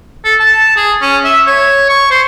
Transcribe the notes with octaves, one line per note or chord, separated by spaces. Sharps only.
A4
A5
G#4
C#4
E5
C#5
C#6
C5